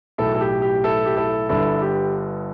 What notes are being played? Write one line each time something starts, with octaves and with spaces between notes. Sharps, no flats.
B1 A2 E3 E4 A4
A4
G4
G4
E4 A4
G4
E4 A4
G1 G2 D3 E4 A4
G4